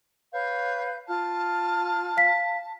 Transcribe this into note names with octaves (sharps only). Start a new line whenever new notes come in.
B4 C#5 F5 G6
F4 A5 F6
F5 B6